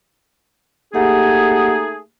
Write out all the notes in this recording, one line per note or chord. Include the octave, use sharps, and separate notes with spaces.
A3 A#3 D#4 G4 G#4 F#5